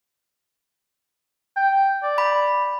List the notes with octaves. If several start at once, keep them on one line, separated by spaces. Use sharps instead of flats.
G5
D5
B5